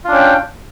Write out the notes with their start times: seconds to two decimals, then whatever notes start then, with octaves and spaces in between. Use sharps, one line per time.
0.05 F4
0.08 D4
0.11 C#4
0.15 G5